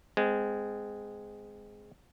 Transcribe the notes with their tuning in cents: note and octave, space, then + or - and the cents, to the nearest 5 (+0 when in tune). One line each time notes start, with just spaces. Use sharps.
G#3 +0 C4 -25